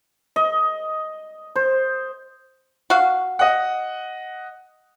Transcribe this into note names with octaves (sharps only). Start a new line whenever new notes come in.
D#5
C5
F#4 F5
D#5 F#5